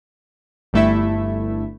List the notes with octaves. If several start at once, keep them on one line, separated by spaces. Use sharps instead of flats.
G1 G2 A3 E4 E5